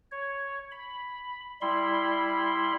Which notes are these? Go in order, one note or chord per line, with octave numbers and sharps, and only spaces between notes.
C#5
B5
G3 E4 B5 C6